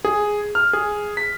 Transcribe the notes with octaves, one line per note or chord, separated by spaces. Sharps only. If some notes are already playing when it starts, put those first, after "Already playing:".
G#4
F6
G#4
B6